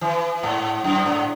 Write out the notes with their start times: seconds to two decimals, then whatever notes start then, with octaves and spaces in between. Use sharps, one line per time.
0.01 E3
0.43 G#2
0.84 F#2
1.06 G#2